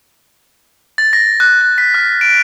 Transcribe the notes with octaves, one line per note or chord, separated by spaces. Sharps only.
A6
A#6
F#6
F#6
B6
F6
D7